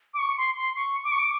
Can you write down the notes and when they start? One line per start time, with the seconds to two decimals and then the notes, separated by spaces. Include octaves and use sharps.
0.14 D6
0.19 C#6
0.38 C6
0.57 C6
0.76 C#6
1.04 D6
1.12 C#6
1.19 D6